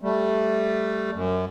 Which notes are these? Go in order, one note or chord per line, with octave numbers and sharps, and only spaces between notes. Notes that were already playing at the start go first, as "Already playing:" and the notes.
G3 A3
F#2